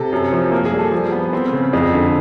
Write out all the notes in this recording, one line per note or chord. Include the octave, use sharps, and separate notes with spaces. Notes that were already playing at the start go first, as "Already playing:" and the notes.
Already playing: C3 A4
F#2
F3
A#3
G#4
G3
A4
F3
B3
C4
C#3
F2 G#4
D3